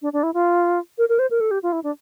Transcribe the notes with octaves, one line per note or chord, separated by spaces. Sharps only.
D4
D4
E4
F4
A#4
A#4
C5
A#4
A4
G4
F4
E4
D4